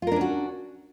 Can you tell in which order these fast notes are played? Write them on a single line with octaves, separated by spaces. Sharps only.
F4 A#4 D4 C#4 F#4